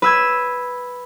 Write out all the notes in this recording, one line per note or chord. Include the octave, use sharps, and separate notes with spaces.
B4 E6 G#6